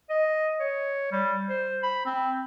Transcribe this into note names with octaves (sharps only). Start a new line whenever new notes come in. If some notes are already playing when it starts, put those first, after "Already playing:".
D#5
C#5
G3
C5
B5
C4